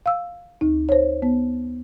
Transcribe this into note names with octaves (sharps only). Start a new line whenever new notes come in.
F5 E6
D2 D#4
C5 C#5
B3